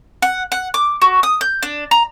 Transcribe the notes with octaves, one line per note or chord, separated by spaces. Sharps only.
F#5
F#5
D6
F#4
D#6
G6
D4
A#5